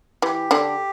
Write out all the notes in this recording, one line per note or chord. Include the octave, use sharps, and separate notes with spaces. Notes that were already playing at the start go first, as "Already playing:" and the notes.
E3 G4
D3 D4